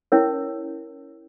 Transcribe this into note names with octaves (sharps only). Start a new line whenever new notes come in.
C#4 E4 A#4 C#5